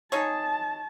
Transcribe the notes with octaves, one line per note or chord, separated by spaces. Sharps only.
D#4 G#4 C#5 A5